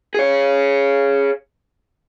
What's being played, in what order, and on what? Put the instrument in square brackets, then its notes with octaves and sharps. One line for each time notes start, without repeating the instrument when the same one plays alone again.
[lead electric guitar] G#4 C#5